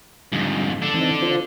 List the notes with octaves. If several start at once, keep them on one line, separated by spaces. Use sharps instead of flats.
F2 G#2 D3 G3
D4 A4
E3 C4 D#4
F4 C5